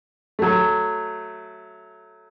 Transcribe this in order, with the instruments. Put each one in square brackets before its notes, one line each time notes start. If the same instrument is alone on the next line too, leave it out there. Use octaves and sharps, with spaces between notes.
[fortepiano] F#3 A3